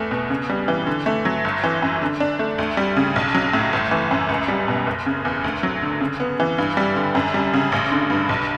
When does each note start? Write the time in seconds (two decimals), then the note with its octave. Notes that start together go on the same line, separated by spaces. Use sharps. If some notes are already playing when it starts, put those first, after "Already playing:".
Already playing: E2 A3
0.11 B2
0.30 C#3
0.49 G3
0.68 E3
0.87 D3
1.06 A3
1.25 F#3
1.45 G1
1.64 E3
1.82 F#2
2.02 D3
2.20 D4
2.39 A3
2.58 D2
2.77 G3
2.96 C#3
3.16 B1
3.35 F#3
3.53 A2
3.73 G1
3.91 E3
4.11 F#2
4.29 C#2
4.48 G3
4.68 B2
4.87 F#1
5.06 C#3
5.25 E2
5.44 D2
5.63 F#3
5.82 D3
6.00 C#3
6.20 B3
6.40 E3
6.58 G2
6.77 G3
6.96 D3
7.15 F#2
7.34 G3
7.53 C#3
7.72 A1
7.92 D3
8.10 G2
8.29 B1